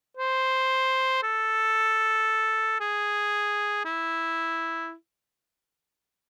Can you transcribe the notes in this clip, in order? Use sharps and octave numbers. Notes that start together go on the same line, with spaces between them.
C5
A4
G#4
E4